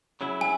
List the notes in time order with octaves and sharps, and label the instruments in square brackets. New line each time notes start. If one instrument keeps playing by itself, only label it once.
[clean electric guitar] C#3 F#3 E4
[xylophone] G#5